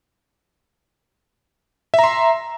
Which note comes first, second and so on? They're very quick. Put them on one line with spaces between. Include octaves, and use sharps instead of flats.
E5 A#5 C6